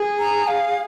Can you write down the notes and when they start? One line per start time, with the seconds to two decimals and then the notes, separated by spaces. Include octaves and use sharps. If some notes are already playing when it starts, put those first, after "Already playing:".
Already playing: G#4
0.19 A#5
0.47 F5